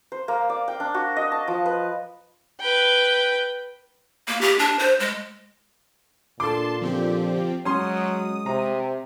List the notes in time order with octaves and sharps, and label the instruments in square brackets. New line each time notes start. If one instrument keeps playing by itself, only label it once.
[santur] C5
A#3
D5
G5
D4
F#4
D#5
A5
F3
B4
[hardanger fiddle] B4 G5
[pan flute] A#3
G4
D4
C5
G#3
[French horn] A#2 [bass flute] D4 [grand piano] A4 D6 [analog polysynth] A5 C6
[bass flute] D3 [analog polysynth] F3 C4 G4
[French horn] F#3 [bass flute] G#3 [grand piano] C#4 C6 [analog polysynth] D#6
[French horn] C3 [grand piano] A#5